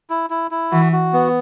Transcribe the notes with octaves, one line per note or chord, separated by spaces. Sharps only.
E4
E4
E4
E3 F#4
F#4
B3